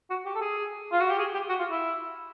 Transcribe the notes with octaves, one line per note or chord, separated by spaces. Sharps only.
F#4
G4
A4
G#4
F4
F#4
G4
G#4
G4
F#4
F4
E4